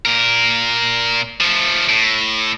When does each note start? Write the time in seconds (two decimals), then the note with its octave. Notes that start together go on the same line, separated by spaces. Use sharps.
0.05 A#2 A#4
1.40 F3 A3
1.89 A2